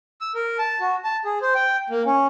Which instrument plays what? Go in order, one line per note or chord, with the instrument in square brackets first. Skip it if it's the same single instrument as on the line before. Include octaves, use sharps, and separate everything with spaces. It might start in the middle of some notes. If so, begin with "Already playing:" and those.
[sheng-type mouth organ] E6
A#4
A5
F#4
A5
G#4
C5
G5
A#3
C#4